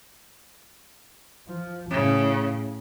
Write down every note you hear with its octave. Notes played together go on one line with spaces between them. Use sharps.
F3
A2 C#3